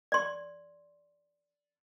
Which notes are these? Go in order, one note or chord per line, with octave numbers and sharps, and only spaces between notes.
D5 C6